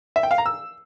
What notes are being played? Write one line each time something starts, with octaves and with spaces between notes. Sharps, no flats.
E5
G5
F5
A#5
E6